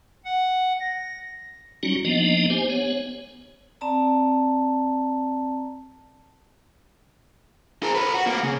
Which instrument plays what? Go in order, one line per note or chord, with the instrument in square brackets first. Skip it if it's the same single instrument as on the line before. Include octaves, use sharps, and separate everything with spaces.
[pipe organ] F#5
A#6
[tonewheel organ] F#3 G3 C#4 D#4 F#4
F3 A#3 B3 D4 D#4 D#5
G4 C5 G#5
B3 C#5
[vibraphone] C4 D5 A5 A#5
[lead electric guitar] G#4 A#4
A4 B4
F#4
A#3 B3
C#3